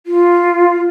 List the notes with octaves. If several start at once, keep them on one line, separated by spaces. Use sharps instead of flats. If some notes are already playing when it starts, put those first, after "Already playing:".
F4